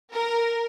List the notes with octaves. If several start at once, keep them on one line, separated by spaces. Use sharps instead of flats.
A#4